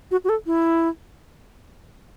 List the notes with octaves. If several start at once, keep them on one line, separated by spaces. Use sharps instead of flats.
F#4
F#4
A4
E4